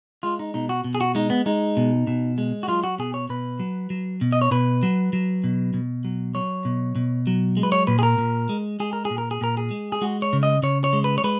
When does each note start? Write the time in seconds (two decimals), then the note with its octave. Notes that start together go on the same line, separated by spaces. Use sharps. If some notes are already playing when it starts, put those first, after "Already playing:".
0.23 G#3 F4
0.39 D#4
0.54 B2 D#4
0.69 F#4
0.84 B2
0.95 G#4
1.01 F#4
1.15 G#3 D#4
1.30 B3
1.46 G#3 D#4
1.77 B2
2.07 B2
2.38 G#3
2.63 F#4
2.68 F#3 F4
2.84 F#4
2.99 B2 G#4
3.14 C#5
3.29 B2 B4
3.59 F#3
3.90 F#3
4.21 B2
4.32 D#5
4.42 C#5
4.51 B2 B4
4.83 F#3
5.13 F#3
5.44 B2
5.74 B2
6.05 F#3
6.35 F#3 C#5
6.65 B2
6.96 B2
7.27 F#3
7.57 G#3
7.63 B4
7.72 C#5
7.87 A#2 B4
7.99 G#4
8.03 A#4
8.18 A#2
8.49 G#3
8.80 G#3 G#4
8.93 A#4
9.05 G#4
9.10 A#2
9.18 A#4
9.31 G#4
9.41 A#2 A#4
9.57 G#4
9.71 G#3
9.92 G#4
10.01 G#3 F#4
10.22 C#5
10.33 C#3
10.43 D#5
10.63 C#3 C#5
10.84 C#5
10.93 G#3
11.04 B4
11.18 C#5
11.24 G#3 B4